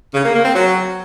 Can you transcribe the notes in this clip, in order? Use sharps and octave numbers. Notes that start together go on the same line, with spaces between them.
C#3
A#3
A#3
C4
F#3